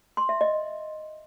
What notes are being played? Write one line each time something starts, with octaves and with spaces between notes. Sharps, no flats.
C6
E5
D#5